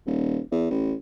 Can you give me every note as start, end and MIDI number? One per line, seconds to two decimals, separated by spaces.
0.06 0.39 27
0.51 0.68 40
0.71 0.94 33